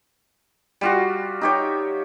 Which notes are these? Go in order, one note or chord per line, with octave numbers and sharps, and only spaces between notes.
G3 F4 F#4
D#4 G4 C#5